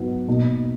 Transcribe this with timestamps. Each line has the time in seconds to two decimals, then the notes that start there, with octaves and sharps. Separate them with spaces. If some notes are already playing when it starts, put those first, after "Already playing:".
Already playing: G#2 F#3 B3 D#4
0.28 B2 A#3 D#4